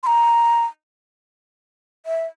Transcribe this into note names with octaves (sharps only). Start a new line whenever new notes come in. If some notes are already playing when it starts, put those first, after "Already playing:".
C6
A#5
E5